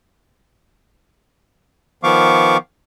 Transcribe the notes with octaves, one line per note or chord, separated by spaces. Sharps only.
D#3 F3 B3 F5 C#6 D6